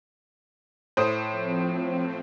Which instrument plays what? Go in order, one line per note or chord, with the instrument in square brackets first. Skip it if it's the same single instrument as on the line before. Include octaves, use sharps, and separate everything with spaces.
[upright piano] A2 C5 D#6
[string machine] F3 C4